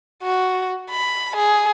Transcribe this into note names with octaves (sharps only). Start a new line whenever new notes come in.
F#4
B5
G#4